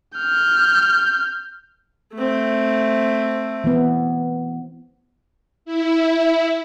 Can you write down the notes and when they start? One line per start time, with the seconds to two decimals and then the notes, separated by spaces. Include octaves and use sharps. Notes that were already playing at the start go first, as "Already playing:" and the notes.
0.18 F6 G6
2.14 A3 C4
3.64 E3 B3
5.65 E4